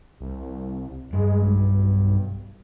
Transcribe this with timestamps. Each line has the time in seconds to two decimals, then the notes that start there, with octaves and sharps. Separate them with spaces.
0.20 C2
1.13 G2 G#3
1.42 B1